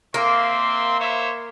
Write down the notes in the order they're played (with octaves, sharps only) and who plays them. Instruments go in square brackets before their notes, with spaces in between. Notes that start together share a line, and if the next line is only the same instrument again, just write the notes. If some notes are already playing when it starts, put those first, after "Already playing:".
[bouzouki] A#3 [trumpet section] C4 E5 C6
[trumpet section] C5 C#5 E5